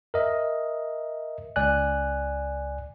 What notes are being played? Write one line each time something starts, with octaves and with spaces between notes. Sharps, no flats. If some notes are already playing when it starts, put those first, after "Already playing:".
A#4 D#5 E5
C#2 D5 G#5 F#6